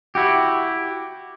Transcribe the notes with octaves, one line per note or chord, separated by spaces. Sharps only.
E4 F#4 G4